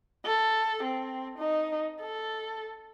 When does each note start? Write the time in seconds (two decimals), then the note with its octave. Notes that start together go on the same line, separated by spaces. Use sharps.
0.26 A4
0.83 C4
1.38 D#4
2.02 A4